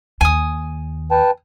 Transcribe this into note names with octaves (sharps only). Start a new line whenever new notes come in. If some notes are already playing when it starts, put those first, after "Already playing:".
D#2 G#5 D#6
B4 G5 A5